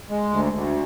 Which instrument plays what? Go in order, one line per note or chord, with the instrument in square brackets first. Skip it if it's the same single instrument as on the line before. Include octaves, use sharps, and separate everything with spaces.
[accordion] G#3
D2
D2